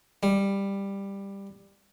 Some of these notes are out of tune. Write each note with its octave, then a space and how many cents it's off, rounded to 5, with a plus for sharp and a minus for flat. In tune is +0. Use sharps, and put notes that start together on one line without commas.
G3 +10